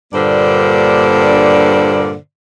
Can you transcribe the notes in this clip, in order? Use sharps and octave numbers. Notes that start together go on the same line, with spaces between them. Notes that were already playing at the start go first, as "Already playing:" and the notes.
G2 A#2 D3 A#3 C5 D5